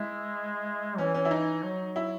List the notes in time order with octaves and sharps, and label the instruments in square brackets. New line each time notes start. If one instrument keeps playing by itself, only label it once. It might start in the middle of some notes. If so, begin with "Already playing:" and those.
Already playing: [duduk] G#3 [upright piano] E4
[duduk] E3 [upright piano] C#4
[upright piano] C#4
E4
D#4
[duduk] F#3
[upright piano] E4